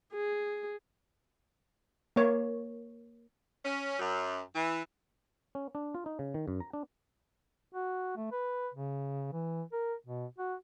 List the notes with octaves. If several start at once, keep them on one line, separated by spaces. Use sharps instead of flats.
G#4
A#3 C#5
C#4
F#2
E3
C#4
D4
F4
D#4
C#3
D#3
F#2
A#5
D4
F#4
A3
B4
C#3
E3
A#4
B2
F#4